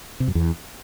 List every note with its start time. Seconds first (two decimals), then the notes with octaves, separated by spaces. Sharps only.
0.20 C3
0.28 F#2
0.35 E2